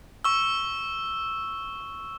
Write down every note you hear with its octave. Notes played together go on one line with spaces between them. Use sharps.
C#6 E6